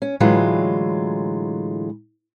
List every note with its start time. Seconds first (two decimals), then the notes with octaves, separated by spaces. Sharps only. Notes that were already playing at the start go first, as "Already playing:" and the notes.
0.02 C#4
0.20 A2 D3 E3 F#3 G#3 F4